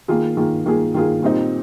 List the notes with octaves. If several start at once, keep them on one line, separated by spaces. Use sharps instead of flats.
D#3 A#3 F4 G#4
D#3 A#3 F4 G#4
D#3 A#3 F4 G#4
D#3 A#3 F4 G#4
A#2 G3 C4 D#4